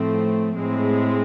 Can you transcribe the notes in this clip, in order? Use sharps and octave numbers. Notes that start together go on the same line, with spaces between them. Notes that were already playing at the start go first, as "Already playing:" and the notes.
Already playing: A2 F3 A3 C4
A2 G#3 C4